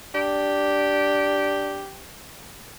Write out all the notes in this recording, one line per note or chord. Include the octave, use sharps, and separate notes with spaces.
D4 G4